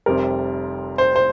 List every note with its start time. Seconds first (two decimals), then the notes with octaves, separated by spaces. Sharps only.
0.06 F1 F2 C3 G3 C4 A#4
0.98 C5
1.16 C5